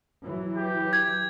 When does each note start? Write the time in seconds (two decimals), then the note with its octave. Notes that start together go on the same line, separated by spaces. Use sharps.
0.22 E3 F#3
0.55 G4
0.93 G#6